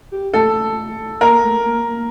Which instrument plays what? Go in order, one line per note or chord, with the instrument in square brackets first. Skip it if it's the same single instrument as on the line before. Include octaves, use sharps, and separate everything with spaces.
[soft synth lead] G4
[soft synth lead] A3 [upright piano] A4
[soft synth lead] A#3 [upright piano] A#4
[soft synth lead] A3
A#3
A#3